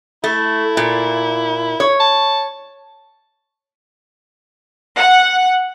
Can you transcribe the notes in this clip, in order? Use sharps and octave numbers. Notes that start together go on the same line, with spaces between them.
A3 E4
A#2
C#5
A5
F#5